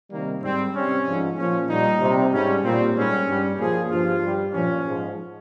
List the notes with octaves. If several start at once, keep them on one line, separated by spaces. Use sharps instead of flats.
C3 D#3 G3 A#3
G#2 G3 C4
C3 G3 C#4
G#2 F3
A#2 F3 C#4
A#2 G3 D#4
C3 G3
G#2 G3 C#4
A#2 G3 C4
G#2 G3 C#4
G2 G3
A#2 F3 G#4
G2 F3 F4
G2 G3
A#2 F3 C#4
G#2 F3